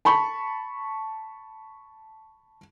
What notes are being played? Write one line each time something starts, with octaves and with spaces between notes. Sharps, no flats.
A5 B5 C#6